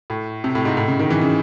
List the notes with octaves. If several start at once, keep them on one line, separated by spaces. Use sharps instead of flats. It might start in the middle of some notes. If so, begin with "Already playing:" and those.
A2
C3
A2
G#2
A2
C#3
D#3
E3
C#3